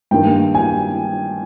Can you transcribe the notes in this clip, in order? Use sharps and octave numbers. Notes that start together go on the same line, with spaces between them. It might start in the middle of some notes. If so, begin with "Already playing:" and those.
G2 D#3 A#3 G5
G#5